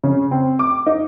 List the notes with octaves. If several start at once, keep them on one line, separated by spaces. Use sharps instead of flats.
C#3
C4
D6
D#4